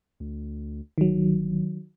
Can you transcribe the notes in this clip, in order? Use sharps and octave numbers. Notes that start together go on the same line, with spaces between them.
D2
G1 D#3 F#3